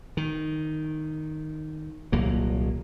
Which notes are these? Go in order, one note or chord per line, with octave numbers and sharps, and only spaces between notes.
D#3
D#1 C2 F#3 A#3